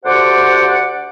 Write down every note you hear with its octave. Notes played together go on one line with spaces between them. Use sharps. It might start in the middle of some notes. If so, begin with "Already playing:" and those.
D2 G4 C5 D5 F#5